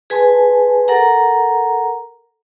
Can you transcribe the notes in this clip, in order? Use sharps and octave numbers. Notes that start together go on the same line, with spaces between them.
G#4 B4 G#5 A5 C6
A4 A#4 F#5 A#5